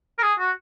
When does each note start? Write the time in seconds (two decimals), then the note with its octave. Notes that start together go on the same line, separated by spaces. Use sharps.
0.19 A#4
0.22 G#4
0.39 F#4